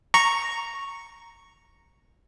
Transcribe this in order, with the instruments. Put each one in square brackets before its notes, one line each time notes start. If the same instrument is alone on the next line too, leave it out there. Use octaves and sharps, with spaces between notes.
[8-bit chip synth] A#5 C#6